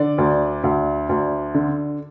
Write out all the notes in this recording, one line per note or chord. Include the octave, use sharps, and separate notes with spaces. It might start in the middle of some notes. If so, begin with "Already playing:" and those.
Already playing: D3 D5
D2
D2
D2
D3